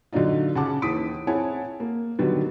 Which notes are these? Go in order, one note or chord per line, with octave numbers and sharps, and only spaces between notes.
D3 F#3 D4 D#4 F4
C#3 F#5 A5 D6
D#2 E3 D#6 B6 D7
C4 E4 C#5 F#5 G#5 A5
A#3
D3 D#3 F#3 G3 B3